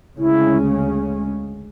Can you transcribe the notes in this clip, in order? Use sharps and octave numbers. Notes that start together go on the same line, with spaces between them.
D2 C#3 G#3 C#4 E4